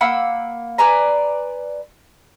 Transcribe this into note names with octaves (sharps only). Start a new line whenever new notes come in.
A#3 F#5 B5 E6
B4 D5 G#5 A#5